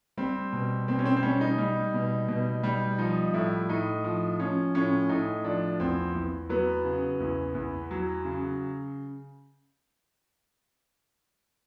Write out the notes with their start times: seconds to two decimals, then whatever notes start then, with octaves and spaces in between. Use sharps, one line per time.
0.17 G3 C4
0.52 B2
0.88 B2 C4
0.99 C#4
1.05 C4
1.16 C4
1.23 G3 C#4
1.41 D#4
1.58 G3
1.94 B2
2.28 B2
2.63 G3
2.98 F3 D#4
3.34 A2 E4
3.69 A2 D#4
4.04 F3
4.39 F3 C#4
4.74 A2 C#4
5.09 A2 D#4
5.44 F3 D4
5.80 E2 C4
6.15 E2
6.49 F#3 B3
6.85 C#3
7.20 E2
7.55 E2
7.91 F#3
8.25 C#3